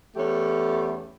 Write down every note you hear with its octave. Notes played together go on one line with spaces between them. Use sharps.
E2 A3 C#4 G4